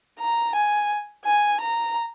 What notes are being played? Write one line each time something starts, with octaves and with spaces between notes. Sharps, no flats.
A#5
G#5
G#5
A#5